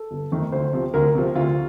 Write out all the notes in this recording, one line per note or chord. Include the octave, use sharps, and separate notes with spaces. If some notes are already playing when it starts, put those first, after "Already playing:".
Already playing: A4
G1
F2 D#3 A3
D2 C5
C3 F3
D2 A#4
C3 F3
D2 F4